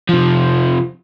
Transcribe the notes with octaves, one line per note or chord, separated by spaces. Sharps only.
C3 F3